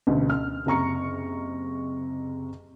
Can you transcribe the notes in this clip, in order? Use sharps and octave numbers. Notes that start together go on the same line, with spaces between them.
A1 D2 B2
F6
F#1 C3 A#5 C#6 C#7